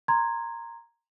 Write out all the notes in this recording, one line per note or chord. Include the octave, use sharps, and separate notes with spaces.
A#5 C6 G#6